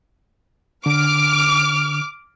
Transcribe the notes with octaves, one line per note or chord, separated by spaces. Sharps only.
D3 D6 F6